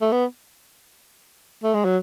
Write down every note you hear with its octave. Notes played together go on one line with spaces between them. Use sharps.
A3
B3
A3
G#3
F#3